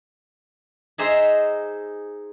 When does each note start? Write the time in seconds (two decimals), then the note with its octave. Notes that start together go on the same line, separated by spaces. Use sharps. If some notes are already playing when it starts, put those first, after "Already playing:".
0.98 D#4 G#4 C5 E5 A#5